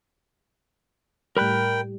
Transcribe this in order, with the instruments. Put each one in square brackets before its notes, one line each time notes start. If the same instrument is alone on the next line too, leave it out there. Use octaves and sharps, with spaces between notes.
[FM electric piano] A2 G3 [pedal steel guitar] A#4 B5 F#6 [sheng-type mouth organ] G5